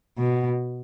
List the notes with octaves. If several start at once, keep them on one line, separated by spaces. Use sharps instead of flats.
B2